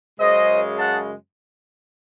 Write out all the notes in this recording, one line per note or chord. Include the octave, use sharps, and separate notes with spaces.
F#2 C#3 G#3 C5 D#5
F#5 A5